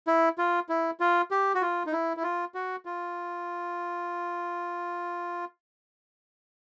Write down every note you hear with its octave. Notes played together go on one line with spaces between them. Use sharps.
E4
F4
E4
F4
G4
F#4
F4
D#4
E4
E4
F4
F#4
F4